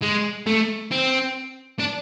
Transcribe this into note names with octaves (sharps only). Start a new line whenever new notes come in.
G#3
A3
C4
D4